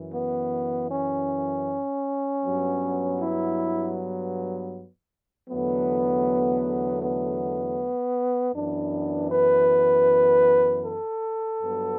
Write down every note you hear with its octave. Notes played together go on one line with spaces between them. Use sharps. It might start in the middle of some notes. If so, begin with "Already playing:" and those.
Already playing: F#2 E3
B3
C#4
G2 F#3 B3
E4
E2 D3 F#3 A3 B3
B3
F#2 E3 B3 D4
B4
A4
G2 F#3 B3